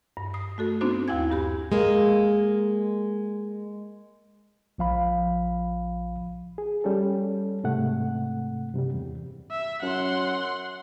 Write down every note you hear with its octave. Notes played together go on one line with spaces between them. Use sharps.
G2
D#6
A3 F#4 A4
B3 C4 D4 D#4 F#4 C5
D#2 E4 F5 G#5 G#6
G2 G4 B5
G#3 A#3
A#1 F3 F5 B5
G#4
G3 C#4 A4
G#2 C3 A3 F#5
G2 C3 G3
E2
E5
F#2 F#5 C6